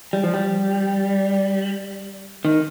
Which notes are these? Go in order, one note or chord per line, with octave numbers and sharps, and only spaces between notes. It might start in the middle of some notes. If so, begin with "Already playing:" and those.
G3
F3
G3
D#3